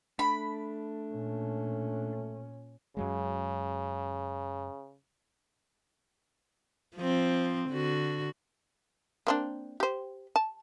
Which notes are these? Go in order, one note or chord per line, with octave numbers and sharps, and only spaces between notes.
A3 D4 B5
A#2 C#4
F#2 C#3 F#3 G#3
F3 C4
D3 F#4
A#3 C4 D4
G4 C5
A5